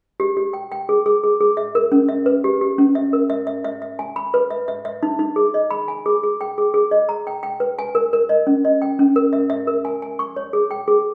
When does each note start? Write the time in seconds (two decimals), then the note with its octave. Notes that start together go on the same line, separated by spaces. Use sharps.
0.20 G4
0.37 G4
0.53 G5
0.72 G5
0.89 G#4
1.06 G#4
1.24 G#4
1.40 G#4
1.57 E5
1.75 A#4
1.92 C#4
2.09 E5
2.26 B4
2.44 G4
2.61 G4
2.78 C#4
2.95 E5
3.13 A#4
3.30 E5
3.47 E5
3.65 E5
3.82 E5
3.99 G#5
4.16 B5
4.34 B4
4.51 E5
4.68 E5
4.85 E5
5.03 D#4
5.19 D#4
5.36 G#4
5.54 D#5
5.71 B5
5.88 G#5
6.06 G#4
6.23 G#4
6.41 G5
6.58 G#4
6.74 G#4
6.91 D#5
7.09 A#5
7.27 G5
7.43 G5
7.60 B4
7.79 G#5
7.95 A#4
8.13 A#4
8.29 D#5
8.47 C#4
8.65 D#5
8.82 G5
8.99 C#4
9.16 A#4
9.33 E5
9.50 E5
9.67 A#4
9.85 G#5
10.02 G#5
10.19 C#6
10.36 C#5
10.53 G#4
10.71 G5
10.88 G#4